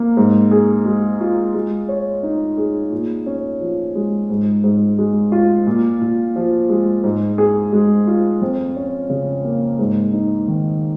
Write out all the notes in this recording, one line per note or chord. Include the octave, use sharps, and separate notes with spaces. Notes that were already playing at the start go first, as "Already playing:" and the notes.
Already playing: A#3
G#2
G#4
G#3
F4
G#3
C#5
D#4
G#4
A#2
C#4
F3
G#3
G#2
G#2
G#3
F4
A#2
A#2
F3
G#3
G#2
G#4
G#3
F4
F2
C#4
C#3
A#3
G#2
D#4
D#3